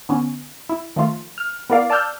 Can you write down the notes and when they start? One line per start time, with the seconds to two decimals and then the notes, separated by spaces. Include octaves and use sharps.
0.09 D3 B3 C#4
0.69 E4
0.96 D#3 F3 A3 F4
1.38 F6
1.70 B3 E4 A#4 D5 F5
1.90 D5 A5 E6 F6 G6